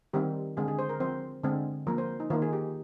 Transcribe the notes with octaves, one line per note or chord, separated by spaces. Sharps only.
D#3 G3 C4 G4
D3 G#3 C4 G#4
G#4
C5
A#4
F3 C4 C5
D3 G#3 C4
F3 A#3 A#4
C5
D#4
D#3 A#3 F4
G#4
G4